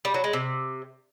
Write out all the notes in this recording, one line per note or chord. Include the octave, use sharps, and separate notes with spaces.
G3
F#3
G#3
C3